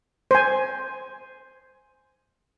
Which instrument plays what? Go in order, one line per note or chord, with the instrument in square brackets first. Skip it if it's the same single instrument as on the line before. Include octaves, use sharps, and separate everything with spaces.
[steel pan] C5 G#5